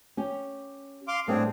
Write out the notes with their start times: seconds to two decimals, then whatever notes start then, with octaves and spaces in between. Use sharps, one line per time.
0.17 C#4 G4
1.08 F5 C6 D6
1.28 A2 G3 B3 C4 D4 G#4